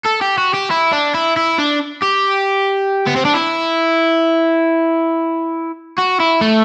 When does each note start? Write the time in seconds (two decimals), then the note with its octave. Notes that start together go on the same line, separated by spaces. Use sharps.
0.05 A4
0.21 G4
0.38 F#4
0.54 G4
0.71 E4
0.92 D4
1.14 E4
1.37 E4
1.59 D4
2.03 G4
3.07 B3
3.16 C4
3.25 D4
3.34 E4
5.98 F#4
6.20 E4
6.41 A3